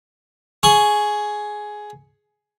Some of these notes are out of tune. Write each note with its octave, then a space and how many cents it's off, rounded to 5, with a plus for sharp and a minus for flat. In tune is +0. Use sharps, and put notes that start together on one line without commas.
G#4 +10 C#6 +0